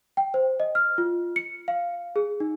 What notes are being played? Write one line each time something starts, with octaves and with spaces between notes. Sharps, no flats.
G5
C5
D#5
F6
F4
C#7
F5
G#4
D#4